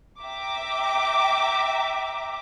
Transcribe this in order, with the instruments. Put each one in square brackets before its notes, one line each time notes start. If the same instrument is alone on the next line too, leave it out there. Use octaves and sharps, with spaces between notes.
[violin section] E5 G5 A#5 D6